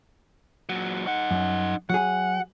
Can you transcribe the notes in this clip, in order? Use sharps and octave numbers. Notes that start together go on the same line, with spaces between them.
A#2 F#3
D#4 F#5
F#2
F#3 G#4 F#5